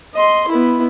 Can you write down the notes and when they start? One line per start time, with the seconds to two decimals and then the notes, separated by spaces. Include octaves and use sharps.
0.14 D#5 C6
0.48 B3 E4